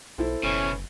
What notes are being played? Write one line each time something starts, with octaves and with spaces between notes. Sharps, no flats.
B1 E4 A4 C5
F#1 B2 E3 C#4